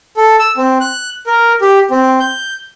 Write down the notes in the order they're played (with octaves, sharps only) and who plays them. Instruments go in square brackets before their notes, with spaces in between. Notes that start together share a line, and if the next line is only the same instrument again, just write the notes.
[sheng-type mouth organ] A4
E6
C4
F#6
A#4
G4
C4
G6